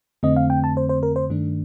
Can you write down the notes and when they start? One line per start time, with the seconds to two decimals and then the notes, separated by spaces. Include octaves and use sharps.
0.23 F2 D3 A3 C4 D#5
0.36 F5
0.50 G5
0.64 A5
0.77 C5
0.89 C5
1.03 A#4
1.16 C5
1.30 G2 D#3 A3 D4